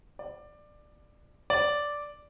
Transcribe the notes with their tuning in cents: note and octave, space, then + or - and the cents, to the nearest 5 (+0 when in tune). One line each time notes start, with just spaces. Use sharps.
D5 +15
D5 -5